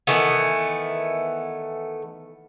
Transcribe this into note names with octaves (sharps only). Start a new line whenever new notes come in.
D#3 E3 A3 B3